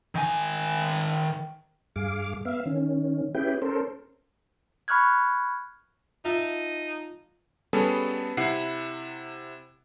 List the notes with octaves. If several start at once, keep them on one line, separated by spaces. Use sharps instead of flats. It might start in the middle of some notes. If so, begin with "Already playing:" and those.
D#3 G#5
G2 G#4 F5 D6
B3 E5 F5
D#3 C#4
C#4 E4 G4 G#4 B4 G5
C#4 A4 A#4 C5
B5 C#6 F6 F#6 G#6
D#4 F4 E5 A5
G3 B3 C#4 G#4 A4
C3 E4 F#5 C7